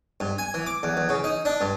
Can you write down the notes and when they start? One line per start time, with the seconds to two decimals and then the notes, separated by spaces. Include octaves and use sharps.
0.20 G2
0.38 G#5
0.54 E3
0.66 D6
0.83 E2
0.97 E2
1.09 C#3
1.24 D#4
1.45 D4
1.61 G2